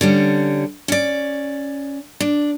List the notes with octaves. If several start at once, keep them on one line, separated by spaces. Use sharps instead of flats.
D3 G3 C#4
C#4 D5
D4